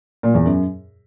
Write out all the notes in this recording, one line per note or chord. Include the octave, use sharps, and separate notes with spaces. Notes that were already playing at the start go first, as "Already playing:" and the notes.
A#2
E2
F#2